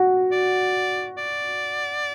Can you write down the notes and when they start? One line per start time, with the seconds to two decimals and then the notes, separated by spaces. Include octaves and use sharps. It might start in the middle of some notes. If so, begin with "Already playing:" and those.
Already playing: F#4
0.32 D5
1.17 D5